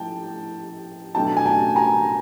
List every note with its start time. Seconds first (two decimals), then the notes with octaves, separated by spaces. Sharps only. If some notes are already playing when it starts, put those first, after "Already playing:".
Already playing: A2 F3 A3 G5 A5
1.15 B2 F#3 A3 D4 G5 A5
1.37 G#5
1.46 G5 A5
1.76 G#5 A#5